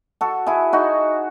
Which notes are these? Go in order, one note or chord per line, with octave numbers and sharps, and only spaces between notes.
F#4 A4
E4 G#4
D#4 F#4